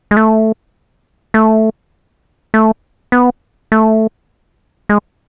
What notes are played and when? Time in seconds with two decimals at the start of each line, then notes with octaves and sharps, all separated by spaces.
0.11 G#3
0.17 A3
1.34 A3
2.54 A3
3.12 B3
3.72 A3
4.89 G#3